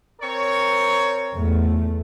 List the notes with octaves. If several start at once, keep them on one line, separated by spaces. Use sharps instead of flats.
C4 A#4 C#5
E2 A3